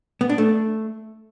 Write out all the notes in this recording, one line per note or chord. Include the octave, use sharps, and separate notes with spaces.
B3
D4
A3